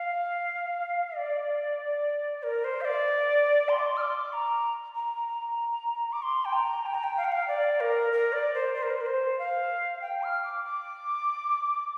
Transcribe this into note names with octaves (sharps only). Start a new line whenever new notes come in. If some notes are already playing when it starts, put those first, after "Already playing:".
Already playing: F5
D5
A#4
C5
F5
D5
C6
D6
C6
F6
D6
A#5
A#5
A#5
D6
C6
G5
A#5
G5
A#5
G5
F5
G5
F5
D5
A#4
A#4
D5
C5
C5
A#4
C5
A#4
C5
F5
G5
F6
D6
D6